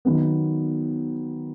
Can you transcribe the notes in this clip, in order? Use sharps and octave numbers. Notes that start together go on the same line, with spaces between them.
D#3 F#3 B3